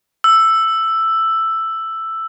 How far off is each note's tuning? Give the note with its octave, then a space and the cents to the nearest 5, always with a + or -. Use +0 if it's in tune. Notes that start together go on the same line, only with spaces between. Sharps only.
E6 +5